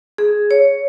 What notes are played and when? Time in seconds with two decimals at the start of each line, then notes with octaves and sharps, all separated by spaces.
0.18 G#4
0.51 C#5